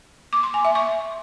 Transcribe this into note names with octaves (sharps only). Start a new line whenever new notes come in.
D6
C6
G#5
E5
C#6